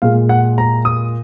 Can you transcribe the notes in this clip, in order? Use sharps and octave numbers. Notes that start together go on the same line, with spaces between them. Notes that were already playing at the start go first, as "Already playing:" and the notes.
A#2 G#3 F5
F#5
A#5
D#6